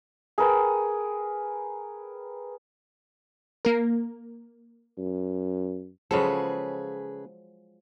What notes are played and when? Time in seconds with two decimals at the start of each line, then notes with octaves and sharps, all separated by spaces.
0.38 G#4 A#4 B4 G5
3.65 A#3 A#4
4.98 F#2
6.11 C#3 F3 F#3 G#3 G#4 A4 B4